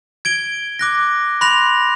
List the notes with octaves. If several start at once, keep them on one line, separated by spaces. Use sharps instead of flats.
G#6 D7 G7
D6 F#6 A#6
B5 C6 F#6 A#6 F7